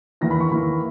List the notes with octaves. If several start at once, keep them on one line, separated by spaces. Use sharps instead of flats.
E2 D#3 A#3 E4 A#6
B5
C#6
E2 D#3 A#3 E4 B5